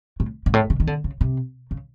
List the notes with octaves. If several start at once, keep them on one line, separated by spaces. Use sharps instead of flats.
A2
G#2
A2
C#3
D#3
D3
C#3
C3
C#3